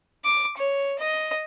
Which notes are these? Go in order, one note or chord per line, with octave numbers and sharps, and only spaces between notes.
D6
C#5
D#5